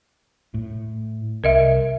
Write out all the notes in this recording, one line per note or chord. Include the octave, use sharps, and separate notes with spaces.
A2
C2 A#4 D#5 E5